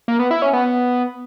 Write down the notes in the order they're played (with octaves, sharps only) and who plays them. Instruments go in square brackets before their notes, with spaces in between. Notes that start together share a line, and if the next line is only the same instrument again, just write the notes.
[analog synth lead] A#3
B3
E4
C#4
B3